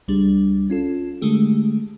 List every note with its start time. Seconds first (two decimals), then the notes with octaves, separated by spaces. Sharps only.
0.08 C#2 G3 D4
0.70 C#4 F4 A4
1.22 D3 G#3 A3 G4